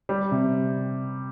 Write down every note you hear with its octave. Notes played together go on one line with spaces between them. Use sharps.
G3
C3